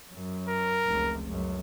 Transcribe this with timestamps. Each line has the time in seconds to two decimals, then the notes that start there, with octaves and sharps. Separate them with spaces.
0.13 F#2
0.48 A#4
0.86 F1 C#2
1.28 C#2 F#2